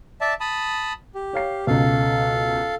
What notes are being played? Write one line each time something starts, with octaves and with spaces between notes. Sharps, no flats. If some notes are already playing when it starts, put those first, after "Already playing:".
D5 E5 A5
A5 B5 D#6
G4
C#5 F5 C7
C#2 B2 A4 F5